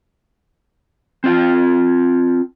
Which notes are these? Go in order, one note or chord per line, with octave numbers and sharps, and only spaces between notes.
C4 F4 G5